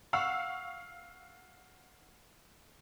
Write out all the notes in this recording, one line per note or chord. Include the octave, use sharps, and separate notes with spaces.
F5 F#5 C#6 E6